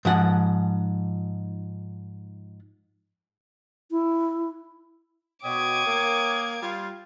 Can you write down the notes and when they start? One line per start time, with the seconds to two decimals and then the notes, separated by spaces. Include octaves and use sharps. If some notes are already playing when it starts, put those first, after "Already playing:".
0.05 G#2 F3 F#5
3.91 E4
5.43 B2 C#5 G5 D6 D#6 G#6
5.86 A#3
6.61 G3 F4